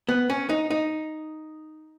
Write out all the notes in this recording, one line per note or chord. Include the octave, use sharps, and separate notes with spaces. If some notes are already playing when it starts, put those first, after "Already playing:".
B3
C#4
D#4
D#4